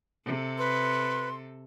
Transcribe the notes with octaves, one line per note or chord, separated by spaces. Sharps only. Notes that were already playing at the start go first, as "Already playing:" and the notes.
C3 A4
B4 C6